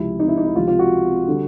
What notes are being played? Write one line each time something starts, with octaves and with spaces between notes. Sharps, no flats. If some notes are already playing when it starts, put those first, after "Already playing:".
Already playing: C#2 C3 F3 E4
D#4
E4
D#4
E4
C#2 C3 F3 F4
F4
F#4
D3 G3